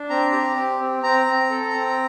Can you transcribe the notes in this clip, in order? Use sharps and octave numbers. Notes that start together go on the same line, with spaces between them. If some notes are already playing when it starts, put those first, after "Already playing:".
Already playing: D4
C4 A#5
G4
C4
C4
C4 A#5
C4
A4
C4